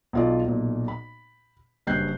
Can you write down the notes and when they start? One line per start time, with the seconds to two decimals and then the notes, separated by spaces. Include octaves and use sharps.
0.13 B1 F4 D5
0.45 B1 A#2
0.88 B5
1.87 F#1 G2 C#4 F#6 G6 C7